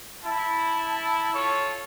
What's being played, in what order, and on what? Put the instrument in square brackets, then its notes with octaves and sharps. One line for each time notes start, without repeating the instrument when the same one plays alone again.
[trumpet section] E4 [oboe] A5
[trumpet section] F4 A4 C#5